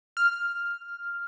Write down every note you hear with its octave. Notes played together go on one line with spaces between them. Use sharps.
F6